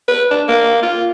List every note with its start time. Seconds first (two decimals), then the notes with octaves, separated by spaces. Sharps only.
0.08 B4
0.31 D4
0.48 A#3
0.83 F4